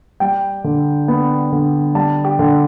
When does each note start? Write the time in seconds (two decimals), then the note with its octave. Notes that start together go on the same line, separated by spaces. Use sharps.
0.20 G3 G5
0.64 D3
1.08 B3
1.52 D3
1.95 G3 A5
2.24 G4
2.39 D3